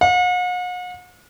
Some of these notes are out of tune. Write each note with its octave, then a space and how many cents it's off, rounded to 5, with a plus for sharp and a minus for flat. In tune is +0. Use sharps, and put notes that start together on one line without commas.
F#5 -45